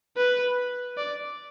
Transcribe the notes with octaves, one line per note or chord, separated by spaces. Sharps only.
B4
D5